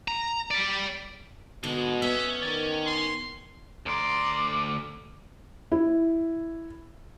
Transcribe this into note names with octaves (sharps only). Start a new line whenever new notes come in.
A#5
G3 D5
G#2 B2 D3 G#3
B3 C#4 E5
D#3 D5
C6
D2 D5 A#5 C6
E4